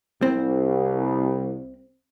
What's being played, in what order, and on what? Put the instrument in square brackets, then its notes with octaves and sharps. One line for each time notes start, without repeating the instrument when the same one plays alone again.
[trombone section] C2 [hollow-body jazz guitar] C4